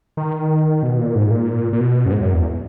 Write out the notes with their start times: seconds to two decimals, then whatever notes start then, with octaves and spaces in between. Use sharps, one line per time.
0.17 D#3
0.83 B2
0.98 A#2
1.15 G#2
1.31 A#2
1.73 A#2
1.80 B2
2.06 F#2
2.12 G#2
2.22 F#2
2.34 E2